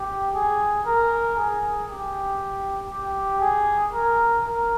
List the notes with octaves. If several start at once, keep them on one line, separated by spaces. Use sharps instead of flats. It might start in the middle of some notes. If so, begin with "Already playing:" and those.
Already playing: G4
G#4
A#4
G#4
G4
G4
G#4
A#4
A#4